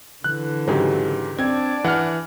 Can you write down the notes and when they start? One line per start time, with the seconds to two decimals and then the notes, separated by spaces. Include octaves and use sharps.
0.24 D3 E3 F#6
0.68 G#2 C#3 F#3 G4
1.39 C4 D4 D5 G#6
1.84 E3 F#5 F6